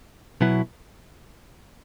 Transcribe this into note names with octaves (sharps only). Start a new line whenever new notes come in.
B2 F#3 B3 E4